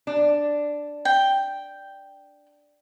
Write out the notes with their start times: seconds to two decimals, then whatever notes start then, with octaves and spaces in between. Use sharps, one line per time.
0.07 D4
1.05 G5